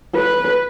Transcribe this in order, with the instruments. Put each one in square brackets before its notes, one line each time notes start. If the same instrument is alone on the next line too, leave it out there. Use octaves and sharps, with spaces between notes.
[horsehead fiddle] B4